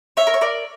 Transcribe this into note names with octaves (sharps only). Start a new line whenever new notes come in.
C#5 E5
A#4
C#5
A#4 D5